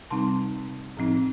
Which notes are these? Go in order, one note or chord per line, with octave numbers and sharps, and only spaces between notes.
C3 G3 C4 D#4 A5 C6
A2 F3 C4 D#4